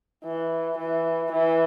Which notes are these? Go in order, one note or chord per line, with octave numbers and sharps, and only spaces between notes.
E3
E3
E3